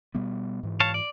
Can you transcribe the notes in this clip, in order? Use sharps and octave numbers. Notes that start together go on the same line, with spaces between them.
B2 G3 B3
G#2 E3
C#5 F5 A5
D5